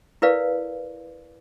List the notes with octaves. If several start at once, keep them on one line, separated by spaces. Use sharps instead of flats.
E4 A#4 B4 D5 F5